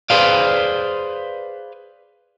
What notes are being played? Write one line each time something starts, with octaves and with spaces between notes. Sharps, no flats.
G#4 B4 C5 D5 F5